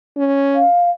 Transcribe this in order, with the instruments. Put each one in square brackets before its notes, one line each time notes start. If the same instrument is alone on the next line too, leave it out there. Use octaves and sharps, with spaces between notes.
[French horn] C#4
[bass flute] F5